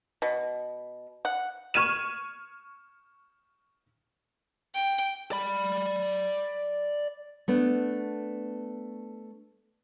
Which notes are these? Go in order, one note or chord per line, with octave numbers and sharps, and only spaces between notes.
B2
F#5
C#6 F6 G#6 D#7 E7
G5
D5 B5
A3 B3 D4